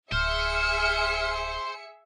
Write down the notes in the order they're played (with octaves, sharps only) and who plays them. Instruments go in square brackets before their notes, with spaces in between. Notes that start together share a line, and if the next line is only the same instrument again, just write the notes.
[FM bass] D1 [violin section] G#4 E5 C#7 [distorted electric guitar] C5 [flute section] F6